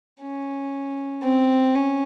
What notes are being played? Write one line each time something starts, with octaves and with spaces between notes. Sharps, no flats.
C#4
C4
C#4